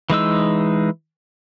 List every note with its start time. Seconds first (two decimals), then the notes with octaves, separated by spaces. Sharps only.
0.10 E3 G#3 D#4 E6